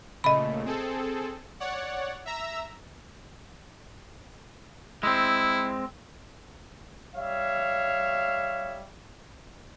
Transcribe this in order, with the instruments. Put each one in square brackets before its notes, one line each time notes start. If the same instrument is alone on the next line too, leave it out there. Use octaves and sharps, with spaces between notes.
[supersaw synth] A#2 C#3 A3 [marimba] D#5 B5
[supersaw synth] C4 G#4 A4
C#5 D5 F#5
E5 A#5 E6
[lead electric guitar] G#3 C4 [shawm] E4
[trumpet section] G3 C#5 E5 F5